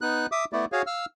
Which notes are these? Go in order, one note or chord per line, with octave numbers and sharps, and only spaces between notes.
B3 D#4 F#6
E5 D6 D#6
A3 B3 E4 D5
F#4 G#4 C#5 F5
F5 E6 F6